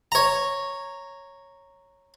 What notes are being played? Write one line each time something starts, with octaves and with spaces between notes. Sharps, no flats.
C#5 A#5